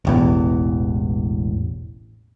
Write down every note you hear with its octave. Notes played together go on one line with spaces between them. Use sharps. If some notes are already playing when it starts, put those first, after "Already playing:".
E1 A1 E2